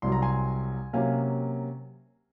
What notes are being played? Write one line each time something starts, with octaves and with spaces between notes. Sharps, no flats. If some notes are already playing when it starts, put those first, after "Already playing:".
C2 C3 F#3 C6
A#5
G#5 C6
C3 F#3 A#3 C#4 F5 G#5